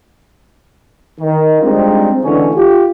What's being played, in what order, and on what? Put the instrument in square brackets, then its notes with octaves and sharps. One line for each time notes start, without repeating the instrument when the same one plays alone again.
[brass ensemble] D#3
G3 G#3 C4 D4 D#4 F4
C#2 A2 D3 E3 C#4
F4 G4